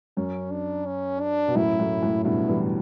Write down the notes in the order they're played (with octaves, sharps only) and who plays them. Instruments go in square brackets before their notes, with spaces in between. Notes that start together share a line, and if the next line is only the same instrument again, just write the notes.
[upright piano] F#2 [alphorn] C#4
[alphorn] D4
C#4
D4
[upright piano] B2
[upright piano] F#2 A2 [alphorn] E4
[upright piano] F#2 A2
F#2 A2
[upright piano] G2 B2 [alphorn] E4
[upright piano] E3 G3